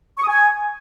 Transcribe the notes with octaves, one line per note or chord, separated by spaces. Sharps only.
C#6
D#6
G#5